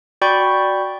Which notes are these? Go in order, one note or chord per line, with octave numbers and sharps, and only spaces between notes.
F#4 D5 G5 B5 C#6 G6